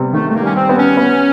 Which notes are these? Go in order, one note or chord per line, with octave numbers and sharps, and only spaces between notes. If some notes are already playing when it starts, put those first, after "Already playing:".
Already playing: C3 G3 B3
D#3 A3
A3
A#3
G3 C#4
C4
B3
C#4
B3